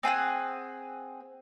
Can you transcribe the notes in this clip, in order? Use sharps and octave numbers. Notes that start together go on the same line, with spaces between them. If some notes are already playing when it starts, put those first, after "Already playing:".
C4 G#4 F#5 G#5